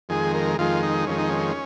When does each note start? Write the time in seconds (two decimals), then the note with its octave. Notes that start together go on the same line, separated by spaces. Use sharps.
0.09 F2 D#3 G#3 G#4
0.34 A#4
0.58 F2 D#3 G#3 F4
0.83 D#4
1.07 F2 D#3 G#3 C#4
1.19 D#4
1.29 C#4